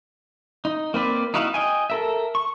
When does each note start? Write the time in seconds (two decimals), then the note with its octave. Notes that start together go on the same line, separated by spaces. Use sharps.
0.65 D#4
0.94 A#3 C4 B4 D5
1.34 D#4 E4 F#4 F5
1.54 D#5 G5 G#5
1.90 A4 A#4 E5
2.35 C#6